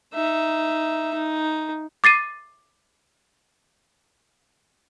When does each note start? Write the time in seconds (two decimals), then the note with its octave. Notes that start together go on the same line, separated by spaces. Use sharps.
0.14 D#4 E5
1.14 D#4
2.04 D6 A6 C7 D#7